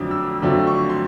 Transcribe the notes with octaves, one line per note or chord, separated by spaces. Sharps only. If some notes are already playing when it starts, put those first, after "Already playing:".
Already playing: F2 D3 F#3 A3 C4 D6 D#6
E6
F2 D3 F#3 A3 C4
C#6
C6